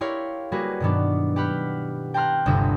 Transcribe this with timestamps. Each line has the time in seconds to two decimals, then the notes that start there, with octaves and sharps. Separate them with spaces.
0.01 E4 G4 A#4 C#5 F5 C6
0.52 G3 A#3 F#4 G#4 A#4 B4
0.80 G2 B2 D#3 F#3 B3 D4
1.36 G4 B4 F#5 B5 F6 G6
2.14 G5 A5 A#5 C6 F6 F#6
2.46 G1 D2 C3 E5 E7